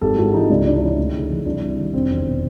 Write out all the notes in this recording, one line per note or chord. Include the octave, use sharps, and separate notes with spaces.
G#1 G4 A4
G#2 E4 F#4
E3 D#4 F4
C#2 D4 E4
C3 D4 E4
E4
E3 C#4 D#4
D2
C#3
E3
C2 D4 E4
C3
D#3
F1 C4 D4
E2
B2